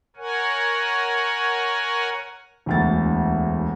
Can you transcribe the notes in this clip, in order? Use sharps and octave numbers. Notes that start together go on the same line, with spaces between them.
A#4 C#5 F#5 G#5
E1 D2 A6